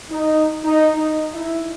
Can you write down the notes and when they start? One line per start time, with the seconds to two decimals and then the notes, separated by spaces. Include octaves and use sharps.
0.11 D#4
0.64 D#4
0.94 D#4
1.33 E4